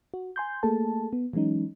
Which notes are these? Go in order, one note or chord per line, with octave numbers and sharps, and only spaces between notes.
F#4
G#5 C6 G6
A3 A#3 G#4 A4 A5
B3
E3 F#3 G#3 C#4 D#4